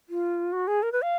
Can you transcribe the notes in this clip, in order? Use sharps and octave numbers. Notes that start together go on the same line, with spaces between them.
F4
F#4
G#4
A#4
B4
F5